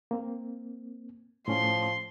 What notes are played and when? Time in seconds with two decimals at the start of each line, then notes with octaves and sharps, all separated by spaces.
0.11 A#3 C4
1.48 A2 F3 C#4 C6